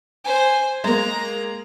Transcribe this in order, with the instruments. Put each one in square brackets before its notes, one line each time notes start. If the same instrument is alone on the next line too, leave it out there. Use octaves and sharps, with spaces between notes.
[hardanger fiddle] C5 G#5
[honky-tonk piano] G#3 A#3 [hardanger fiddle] A#5